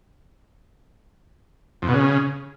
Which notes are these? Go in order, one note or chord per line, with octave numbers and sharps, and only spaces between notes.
F2
B2
C#3